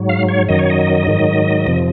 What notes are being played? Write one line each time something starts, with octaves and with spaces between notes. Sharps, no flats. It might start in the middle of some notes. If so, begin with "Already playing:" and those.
Already playing: G#2 F#3
F5
C#5
F#2 D#3 F#3 D#5
C#5
D#5
G#2 D#3 F#3
F2 C3 F3